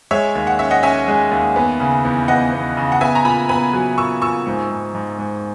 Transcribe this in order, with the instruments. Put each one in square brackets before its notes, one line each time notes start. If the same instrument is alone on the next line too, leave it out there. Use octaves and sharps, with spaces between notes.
[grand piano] G#3 [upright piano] C#5 E5
[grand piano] D#2
[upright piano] F#5
[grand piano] C#4 [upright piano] E5
[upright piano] D#5 F#5
[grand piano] C#4 [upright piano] E5 G#5
[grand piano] G#3
D#2
B3
C#3
E2
[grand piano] B3 [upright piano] D#5 F#5
[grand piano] B3
C#3
[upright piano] F#5
[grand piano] B3 [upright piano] E5 G#5
[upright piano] A#5
[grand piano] A#2 [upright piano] G#5 B5
[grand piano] B3 [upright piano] G#5 B5
[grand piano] F#3
[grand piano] A#2 [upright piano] C#6 E6
[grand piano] A#2 [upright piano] C#6 E6
[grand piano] G#2
G#2
G#2
G#2